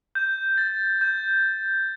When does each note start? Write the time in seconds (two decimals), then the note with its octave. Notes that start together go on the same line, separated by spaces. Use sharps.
0.15 G6
0.58 A6
1.01 G6